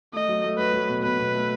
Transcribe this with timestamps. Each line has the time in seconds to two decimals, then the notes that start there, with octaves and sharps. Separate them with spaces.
0.13 A3 D#5
0.28 F#3
0.44 A3
0.58 F#3 B4
0.73 F#3
0.89 B2
1.03 B2 B4
1.19 B2
1.35 A3